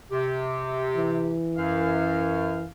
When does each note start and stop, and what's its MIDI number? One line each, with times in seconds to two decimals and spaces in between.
0.11 1.36 48
0.11 1.36 67
0.96 2.66 52
1.56 2.71 42
1.56 2.71 77